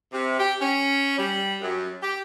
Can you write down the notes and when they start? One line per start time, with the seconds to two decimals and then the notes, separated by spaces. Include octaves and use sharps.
0.12 C3
0.38 G4
0.59 C#4
1.18 G3
1.61 F#2
2.02 G4